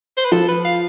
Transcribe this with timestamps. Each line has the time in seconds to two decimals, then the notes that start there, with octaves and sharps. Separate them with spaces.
0.17 C5
0.25 B4
0.32 F3 A4
0.48 B4
0.65 F5